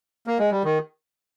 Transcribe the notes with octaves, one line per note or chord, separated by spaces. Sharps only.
A#3
G#3
G3
D#3